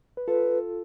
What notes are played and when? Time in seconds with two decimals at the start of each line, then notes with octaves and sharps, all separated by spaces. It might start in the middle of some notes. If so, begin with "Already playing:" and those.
0.17 B4
0.28 F4 A4 B4